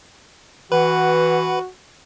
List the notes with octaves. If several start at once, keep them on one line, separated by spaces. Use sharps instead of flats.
E3 F#4 B4 F#5